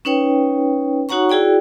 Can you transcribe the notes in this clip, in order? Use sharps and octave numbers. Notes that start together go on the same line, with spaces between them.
C#4 D#4 B4 C#5 G5
D#4 F#4 C#5 F#5 A#5 C#6
E4 F#4 G#4 D5 G5